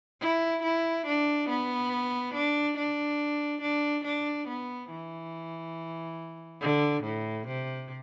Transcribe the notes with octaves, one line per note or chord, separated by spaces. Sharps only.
E4
E4
D4
B3
D4
D4
D4
D4
B3
E3
D3
A2
C3